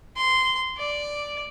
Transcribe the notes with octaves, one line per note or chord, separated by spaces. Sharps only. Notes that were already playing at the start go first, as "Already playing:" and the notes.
C6
D5